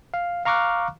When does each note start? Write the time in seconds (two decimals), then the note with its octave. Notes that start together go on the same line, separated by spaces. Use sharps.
0.14 F5
0.45 F5 A#5 C#6 D6 F6 F#6